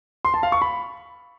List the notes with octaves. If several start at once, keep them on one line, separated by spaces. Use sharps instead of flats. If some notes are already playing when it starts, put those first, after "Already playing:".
C6
A5
F5
C#6
B5